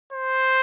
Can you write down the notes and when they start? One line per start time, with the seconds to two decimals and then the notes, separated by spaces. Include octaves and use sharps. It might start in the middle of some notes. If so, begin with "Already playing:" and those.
0.13 C5